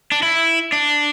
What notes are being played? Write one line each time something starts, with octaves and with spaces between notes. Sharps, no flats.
D4
E4
D4